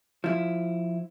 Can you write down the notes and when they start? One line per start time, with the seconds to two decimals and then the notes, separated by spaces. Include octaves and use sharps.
0.24 F3 E4